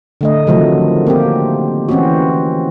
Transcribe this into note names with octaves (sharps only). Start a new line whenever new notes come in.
D3 A3 D#5
C3 D#3 F3 F#3 A3
A#3 C4 G4
E3 C4 C#4 F#4